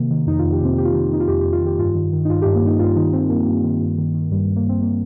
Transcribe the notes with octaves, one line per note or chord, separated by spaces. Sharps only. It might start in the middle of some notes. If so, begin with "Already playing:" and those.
Already playing: C3 D#3 A#3
D#3
F2 D#4
F4
F2
G4
C3 C4
C3 G4
F4
D#3 G4
D#3 D#4
F4
F2 G4
F2 G4
F4
D#3
G4
G2 F4
D#3
D#3
D#4
G2 F4
G2 G4
A#3
G2 D#4
D#4
G2 F4
D#3 D#4
D#3 C4
G2 A#3
G2
D#3
G2
D#3
D#3
G2 G3
G3
G2
A#3
G2 C4
A#3